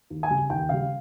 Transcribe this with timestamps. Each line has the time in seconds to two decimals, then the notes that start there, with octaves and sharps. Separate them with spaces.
0.10 D#2
0.23 G#5
0.30 C#3 G3
0.50 D#2 G5
0.69 C#3 G3 F5